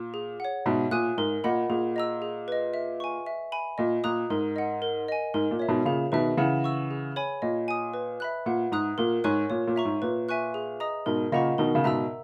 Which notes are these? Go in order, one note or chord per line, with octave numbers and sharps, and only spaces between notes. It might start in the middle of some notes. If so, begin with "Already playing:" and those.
Already playing: A#2
G#4
C#5 F#5
G#2 B2 E5
A#2 G#5 D#6 F#6
G#2 A#4
A#2 D#5 F#5 B5
A#2 G#4
D#5 A#5 E6
G#4
B4 D#5
E5
G#5 C#6
E5
G#5 B5
A#2 D#5
A#2 A#5 D#6 F#6
G#2 A#4
D#5 F#5
A#4
D#5 G#5
G#2 A#4
A#2
C#5 E5
G#2 B2
A#2 C#3 G#4
B2 D#3 B4 E5
C#3 E3 F#5
C#6 E6
G#4
C#5 G#5 B5
A#2 D#5
G#5 D#6
B4
E5 B5 F#6
A#2 F#5
G#2 A#5 D#6 F#6
A#2 A#4
G#2 C#5 G#5 C#6 F#6
A#2 C#5
A#2
E5 A#5 C#6
G#2
A#2 B4
E5 G#5 C#6 F#6
G#4
D#5 A#5 D#6
G#2 B2 A#4
A#2 C#3 D#5 F#5 A#5 C#6
B2 D#3 A#4
C#3
G#2 B2 E5 A#5 E6